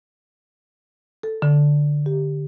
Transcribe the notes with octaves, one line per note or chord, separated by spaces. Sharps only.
A4
D3
G4